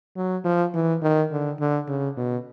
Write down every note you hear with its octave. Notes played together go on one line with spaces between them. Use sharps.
F#3
F3
E3
D#3
D3
D3
C#3
B2